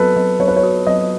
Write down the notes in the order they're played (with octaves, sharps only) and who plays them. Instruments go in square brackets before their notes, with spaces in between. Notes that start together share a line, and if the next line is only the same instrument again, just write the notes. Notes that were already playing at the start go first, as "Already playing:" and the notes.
Already playing: [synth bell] F#3 B3 F#4 [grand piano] A4 B4
[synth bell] F#3
[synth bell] F#3 [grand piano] C#5
[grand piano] B4
C#5
[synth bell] F#4
[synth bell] F#3 [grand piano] D#5